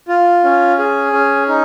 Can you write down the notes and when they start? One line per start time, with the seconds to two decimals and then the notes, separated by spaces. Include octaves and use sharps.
0.08 F4
0.44 C#4
0.79 G#4
1.13 C#4
1.48 D#4